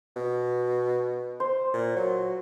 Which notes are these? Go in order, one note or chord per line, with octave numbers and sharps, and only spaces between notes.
B2
C5
A#2
F#3